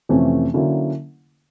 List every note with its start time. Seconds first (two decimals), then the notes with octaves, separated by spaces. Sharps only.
0.09 F2 C3 E3 A3 C#4
0.54 D3 F#3 A#3 C#4 E4